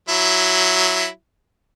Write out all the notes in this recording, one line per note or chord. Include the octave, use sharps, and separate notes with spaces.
F#3 E4